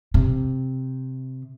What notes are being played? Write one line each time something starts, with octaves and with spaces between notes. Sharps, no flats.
C3